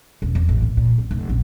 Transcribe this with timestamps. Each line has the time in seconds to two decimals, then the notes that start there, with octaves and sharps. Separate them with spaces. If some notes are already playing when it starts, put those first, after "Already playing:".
0.22 E1
0.35 E2
0.49 A1
0.62 A#2
0.77 A#2
0.98 A#1
1.11 F1
1.29 A#1